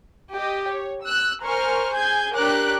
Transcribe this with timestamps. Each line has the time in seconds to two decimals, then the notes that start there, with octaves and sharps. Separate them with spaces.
0.33 G4 D#5
0.69 C#5
1.04 E6 F#6
1.42 A#4 C5 G#5 C#6 F6
1.92 G#4 G#5 G6 G#6
2.35 D4 G4 A#4 C#5 D6 F#6